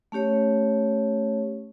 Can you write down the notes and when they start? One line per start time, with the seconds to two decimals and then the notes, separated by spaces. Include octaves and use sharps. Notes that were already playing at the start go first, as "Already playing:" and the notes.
0.12 A3 C#4 G4 C#5